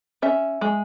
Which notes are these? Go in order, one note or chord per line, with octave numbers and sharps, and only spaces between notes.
C#4 E5
G#3